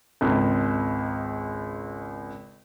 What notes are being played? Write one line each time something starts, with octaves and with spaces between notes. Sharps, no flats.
G#1 C#2